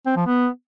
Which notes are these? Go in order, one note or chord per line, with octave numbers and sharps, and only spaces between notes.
C4
F3
B3